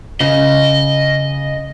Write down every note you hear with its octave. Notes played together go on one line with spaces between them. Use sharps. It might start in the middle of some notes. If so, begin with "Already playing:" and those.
C#3 D#5